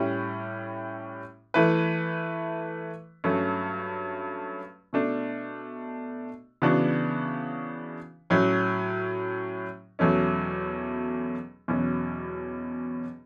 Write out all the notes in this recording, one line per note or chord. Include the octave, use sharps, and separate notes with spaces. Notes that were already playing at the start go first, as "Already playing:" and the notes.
Already playing: A2 G3 C#4 E4
E3 A3 E4 B4
G2 F#3 A3 C#4
B2 A3 D4
C#3 E3 B3 D4 F#4
A2 F#3 C#4
E2 B2 F#3 A3 C#4
E2 B2 F#3 C#4